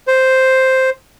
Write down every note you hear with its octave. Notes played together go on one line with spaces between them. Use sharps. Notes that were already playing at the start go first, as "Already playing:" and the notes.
C5